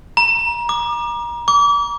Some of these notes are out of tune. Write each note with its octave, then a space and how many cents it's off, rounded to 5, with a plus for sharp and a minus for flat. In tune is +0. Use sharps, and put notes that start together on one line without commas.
A#5 +30
D6 +30
D6 -35